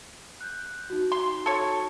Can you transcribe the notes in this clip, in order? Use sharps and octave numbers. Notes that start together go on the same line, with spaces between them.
F#6 G6
D#4 F#4
C6
A4 C#5